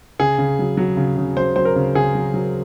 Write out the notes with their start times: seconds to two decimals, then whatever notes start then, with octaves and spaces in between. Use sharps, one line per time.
0.19 C#3 G#4
0.38 C#3
0.59 F#3
0.77 F#3
0.97 C#3
1.17 C#3
1.37 F#3 C5
1.56 F#3 C5
1.65 A#4
1.76 C#3
1.95 C#3 G#4
2.15 F#3
2.34 F#3